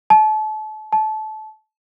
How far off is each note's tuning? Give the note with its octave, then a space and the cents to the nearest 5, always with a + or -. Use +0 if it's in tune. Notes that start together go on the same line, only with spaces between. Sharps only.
A5 -35
A5 -25